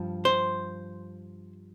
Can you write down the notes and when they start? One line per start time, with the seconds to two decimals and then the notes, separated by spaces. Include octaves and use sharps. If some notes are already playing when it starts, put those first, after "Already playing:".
Already playing: G2 F3
0.25 C5